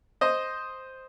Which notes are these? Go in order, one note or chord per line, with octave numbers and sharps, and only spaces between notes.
C5 D#5